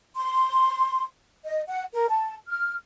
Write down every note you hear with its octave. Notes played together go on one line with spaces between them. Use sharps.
C6
D#5
F#5
A#4
A5
F6